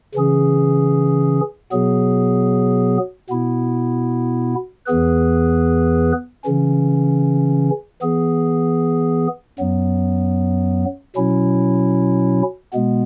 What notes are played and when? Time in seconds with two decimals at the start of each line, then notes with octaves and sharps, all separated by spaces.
0.15 C#3 E3 C#4 G#4
1.72 B2 F#3 B3 G#4
3.29 B2 B3 E4
4.86 E2 E3 B3 G#4 B4
6.44 C#3 E3 C#4
8.02 E3 B3 G#4
9.59 F#2 F#3 B3
11.16 B2 F#3 C#4 E4
12.73 B2 G#3 B3